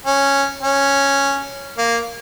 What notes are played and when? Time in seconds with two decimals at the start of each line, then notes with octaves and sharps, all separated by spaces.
0.05 C#4
0.63 C#4
1.78 A#3